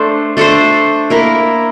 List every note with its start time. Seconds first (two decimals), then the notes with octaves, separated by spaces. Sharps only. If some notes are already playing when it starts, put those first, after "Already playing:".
Already playing: A3 D4 A4 C5
0.37 A3 D4 A4 C5
1.10 A#3 E4 A#4